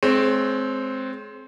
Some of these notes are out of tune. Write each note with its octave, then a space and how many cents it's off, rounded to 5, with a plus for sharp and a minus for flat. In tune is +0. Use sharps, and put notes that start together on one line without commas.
G#3 +35 C4 +0 C#5 +0